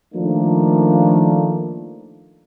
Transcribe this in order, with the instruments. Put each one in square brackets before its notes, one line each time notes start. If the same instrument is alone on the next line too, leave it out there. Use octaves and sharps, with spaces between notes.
[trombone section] D#3 F3 A3 A#3 D4